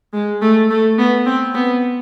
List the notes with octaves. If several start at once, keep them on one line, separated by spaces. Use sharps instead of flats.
G#3
A3
A3
B3
C4
B3